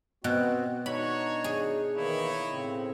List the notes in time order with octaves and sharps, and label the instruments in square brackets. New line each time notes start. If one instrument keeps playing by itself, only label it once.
[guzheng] B2 [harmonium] B3 C4 F#4
[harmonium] D4 D#4 [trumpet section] F#4 C#5 [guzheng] B5
[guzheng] G#4
[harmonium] D#3 E3 A#3 [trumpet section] D#4 E4 C#5
[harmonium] A2 C#3 C4